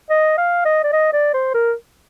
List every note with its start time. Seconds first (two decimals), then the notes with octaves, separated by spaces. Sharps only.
0.10 D#5
0.38 F5
0.65 D#5
0.84 D5
0.92 D#5
1.13 D5
1.34 C5
1.54 A#4